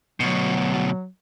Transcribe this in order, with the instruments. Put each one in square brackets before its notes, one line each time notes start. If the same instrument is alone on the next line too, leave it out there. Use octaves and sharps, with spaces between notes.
[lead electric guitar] D2 B2 [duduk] F#3